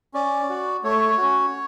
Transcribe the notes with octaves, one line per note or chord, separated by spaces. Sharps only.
C#4 D5
F#4
A3 C#5
C#4 F#4